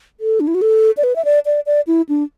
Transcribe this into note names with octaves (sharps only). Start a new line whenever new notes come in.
A4
D4
E4
F#4
A4
D5
B4
E5
D5
D5
D5
E4
D4